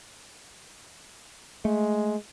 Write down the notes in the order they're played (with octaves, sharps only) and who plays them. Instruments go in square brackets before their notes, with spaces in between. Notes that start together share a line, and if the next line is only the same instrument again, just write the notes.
[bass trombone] G#3 [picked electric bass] A3